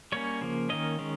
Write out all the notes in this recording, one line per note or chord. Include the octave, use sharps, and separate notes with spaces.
G3 A#3 C#4 C#5
C#3 F3 A#3
D#3 A#3 C#4 D#5
D#3 G#3 C#4